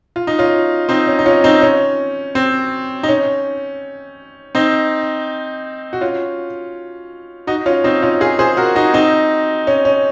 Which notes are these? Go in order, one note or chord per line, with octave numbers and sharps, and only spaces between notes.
F4
D#4
C#4 F4
C4 D#4
C#4
D#4
C#4 F4
C4 D#4
C#4
C4
D#4
C#4
C4 D#4
F#4
C#4 F4
D#4 F#4
C#4 F4
C4 D#4
C#4 F4
F4 G#4
G#4 C5
F#4 A#4
D#4 F#4
C4 D#4
C#4
C#4